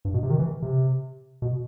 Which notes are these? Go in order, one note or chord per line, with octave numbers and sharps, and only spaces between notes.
G2
B2
C3
D#3
E3
C3
B2